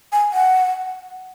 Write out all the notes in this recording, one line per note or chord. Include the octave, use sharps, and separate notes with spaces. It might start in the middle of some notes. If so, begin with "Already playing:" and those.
G#5
F#5